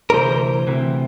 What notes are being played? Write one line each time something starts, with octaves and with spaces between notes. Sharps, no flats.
A#4
D2 C3 E3 C5
D2 C3 E3